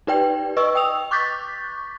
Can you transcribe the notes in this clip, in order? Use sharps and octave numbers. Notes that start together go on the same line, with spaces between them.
D#4 G4 B4 D5 G5
B4 D#5 C#6 E6
G5 D#6 E6 F7
C#6 D6 F#6 G6 A6 B6